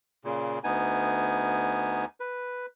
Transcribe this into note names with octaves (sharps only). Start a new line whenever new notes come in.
A#2 C#3
D2 B3 D#4 G#5
B4